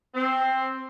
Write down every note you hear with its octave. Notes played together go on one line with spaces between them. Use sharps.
C4